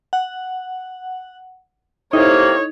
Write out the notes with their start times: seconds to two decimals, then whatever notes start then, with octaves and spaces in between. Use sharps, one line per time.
0.13 F#5
2.13 C3 A#3 D#4 E4 A4 C#5